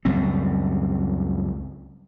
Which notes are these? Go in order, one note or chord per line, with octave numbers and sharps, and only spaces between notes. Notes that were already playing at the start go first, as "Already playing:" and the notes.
C#2 F#2 G3 C4